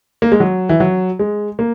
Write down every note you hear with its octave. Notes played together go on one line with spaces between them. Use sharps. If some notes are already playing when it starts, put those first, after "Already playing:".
A#3
G#3
F#3
E3
F#3
G#3
A#3